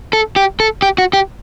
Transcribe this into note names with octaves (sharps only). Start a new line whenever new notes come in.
A4
G4
A4
G4
F#4
G4